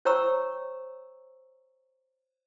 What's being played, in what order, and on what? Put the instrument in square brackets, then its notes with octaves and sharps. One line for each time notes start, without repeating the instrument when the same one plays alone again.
[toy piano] C5 C#5 G5 A#5 C#6 E6